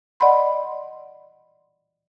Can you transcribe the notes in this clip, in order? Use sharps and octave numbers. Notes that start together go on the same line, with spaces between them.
D5 D#5 F#5 B5 C6